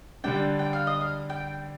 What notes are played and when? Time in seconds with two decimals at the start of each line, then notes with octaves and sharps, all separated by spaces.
0.24 D3 G3 D4 G5
0.59 G5
0.73 F5
0.87 D#5
1.01 F5
1.30 G5